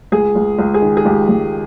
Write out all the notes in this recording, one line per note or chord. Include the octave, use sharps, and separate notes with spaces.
C#2 G#4
C#2
C#2
G#4
D#3
G#4
C#2 G4
C#2